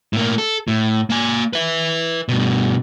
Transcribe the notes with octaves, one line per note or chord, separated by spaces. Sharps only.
A2 A#3
A4
A2
A#3 G#5
B4 E5
G2 B2